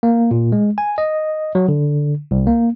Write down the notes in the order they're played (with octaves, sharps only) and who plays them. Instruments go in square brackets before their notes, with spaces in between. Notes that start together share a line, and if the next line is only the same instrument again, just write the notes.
[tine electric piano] A#3
A#2
G#3
G#5
D#5
F#3
D3
C2
A#3